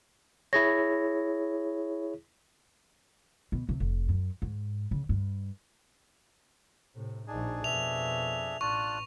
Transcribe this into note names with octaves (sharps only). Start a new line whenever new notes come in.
E4 G#4 C#5 A#6
B2
C3
F1
F#2
G#2
C#3
G2
A2 C3
A#1 D4 D#4 G#4
F2 B2 E5 F7
A1 D4 F4 C#6 F#6